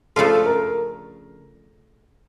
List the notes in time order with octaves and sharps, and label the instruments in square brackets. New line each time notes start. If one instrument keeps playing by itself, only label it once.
[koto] C#3 F3 A3 D4 F4 [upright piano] A4
[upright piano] A#4